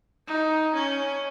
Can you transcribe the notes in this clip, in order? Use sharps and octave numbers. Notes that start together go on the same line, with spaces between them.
D#4
C#4